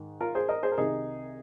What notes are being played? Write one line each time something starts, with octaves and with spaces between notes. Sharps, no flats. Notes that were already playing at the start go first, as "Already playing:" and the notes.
Already playing: G#2 D#3
F4 A#4
G#4 C5
A#4 D#5
G#4 C5
A#4
C2 C3 D#3 D#4 G#4